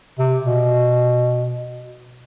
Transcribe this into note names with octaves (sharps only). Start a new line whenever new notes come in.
C3
B2